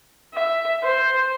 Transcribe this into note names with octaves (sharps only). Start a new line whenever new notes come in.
E5
C5